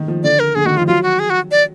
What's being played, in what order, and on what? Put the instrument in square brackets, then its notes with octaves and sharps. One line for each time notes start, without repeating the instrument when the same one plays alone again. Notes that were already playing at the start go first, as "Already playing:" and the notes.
Already playing: [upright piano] D#3
F3
[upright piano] D3 [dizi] D5
[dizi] A#4
[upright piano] D3 [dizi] G#4
[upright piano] D#3 [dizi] F#4
[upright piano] F3 [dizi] F4
[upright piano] F#3 [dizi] F4
[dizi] F#4
G#4
F#4
D5